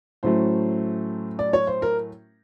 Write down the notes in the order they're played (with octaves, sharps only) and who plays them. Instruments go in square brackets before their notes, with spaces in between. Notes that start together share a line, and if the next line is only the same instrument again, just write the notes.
[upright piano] A2 F#3 A3 C#4 C5
D5
C#5
C5
A#4